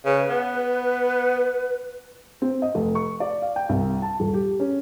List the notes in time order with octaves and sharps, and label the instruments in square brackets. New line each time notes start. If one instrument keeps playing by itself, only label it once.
[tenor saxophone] C#3 [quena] B4
[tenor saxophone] B3
[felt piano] C4
D#5
F1
C#6
D5
F5
G5
C2
A5
D#1
G4
C#4